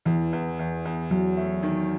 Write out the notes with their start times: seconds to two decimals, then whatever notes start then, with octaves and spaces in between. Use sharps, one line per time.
0.05 E2 E3
0.33 E2
0.59 E2
0.85 E2
1.11 E2 F#3
1.37 A3
1.63 D#3